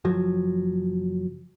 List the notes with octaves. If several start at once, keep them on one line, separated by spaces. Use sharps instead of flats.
F#1 F3 F#3